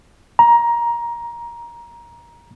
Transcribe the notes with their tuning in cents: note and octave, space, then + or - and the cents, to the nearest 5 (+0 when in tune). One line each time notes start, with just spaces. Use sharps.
A#5 +15